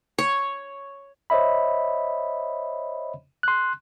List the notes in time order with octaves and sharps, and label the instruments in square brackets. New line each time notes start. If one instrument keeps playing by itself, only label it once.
[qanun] C#5
[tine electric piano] C5 C#5 D#5 E5 B5
C6 F#6